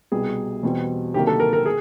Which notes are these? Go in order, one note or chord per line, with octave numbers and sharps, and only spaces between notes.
C2 B2 G3 G#4
E2 B2 G3 C4
D2 C3 D#3 F#3 A#3 G4
A4
A#4
A#4
G#4